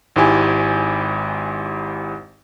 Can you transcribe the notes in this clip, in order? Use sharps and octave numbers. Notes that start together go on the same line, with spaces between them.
G#1 G#2 E4 G4 G#5